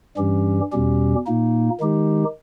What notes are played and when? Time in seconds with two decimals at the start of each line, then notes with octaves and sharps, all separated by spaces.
0.17 G2 E3 G3 C#4 G4
0.72 E2 B2 G3 C#4 G4
1.26 A#2 A#3 D#4
1.80 D#3 G#3 D#4 G4